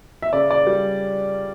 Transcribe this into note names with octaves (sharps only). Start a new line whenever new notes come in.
E5
C#3 D5
D5
G3